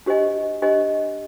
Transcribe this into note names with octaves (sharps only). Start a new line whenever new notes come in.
D4 G4 C5 D#5 G#5
D4 G4 C5 D#5 G#5